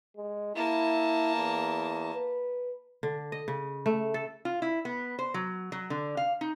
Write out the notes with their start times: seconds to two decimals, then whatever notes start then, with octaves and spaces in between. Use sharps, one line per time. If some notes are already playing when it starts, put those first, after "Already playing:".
0.17 G#3
0.56 A#3 E4 A5
1.35 E2
2.15 B4
3.03 D3
3.32 D#5
3.48 C#3
3.86 A3
4.14 A4
4.45 F4
4.62 E4
4.85 B3
5.19 C5
5.34 F#3
5.72 F#3
5.90 D3
6.17 F5
6.41 D#4